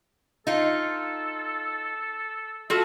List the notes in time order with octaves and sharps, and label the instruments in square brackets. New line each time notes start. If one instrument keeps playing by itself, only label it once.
[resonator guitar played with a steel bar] D#4 F4 [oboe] A4
[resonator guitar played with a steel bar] F4 F#4 A4 [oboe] E5